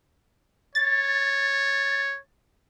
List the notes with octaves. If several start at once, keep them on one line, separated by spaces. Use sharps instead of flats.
C#5 A6